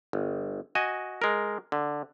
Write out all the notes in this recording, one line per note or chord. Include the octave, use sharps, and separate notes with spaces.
G1
F#4 D#5 G#5
G#3 A#4
D3